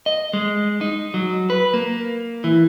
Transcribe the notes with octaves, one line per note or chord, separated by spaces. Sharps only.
D#5
G#3
D#4
F#3
B4
A#3
E3